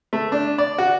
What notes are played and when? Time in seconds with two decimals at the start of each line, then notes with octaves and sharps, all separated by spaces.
0.13 A3
0.32 D4
0.58 D5
0.78 F#4